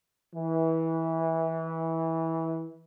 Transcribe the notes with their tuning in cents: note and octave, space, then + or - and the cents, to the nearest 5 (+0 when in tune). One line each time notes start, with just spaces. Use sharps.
E3 -20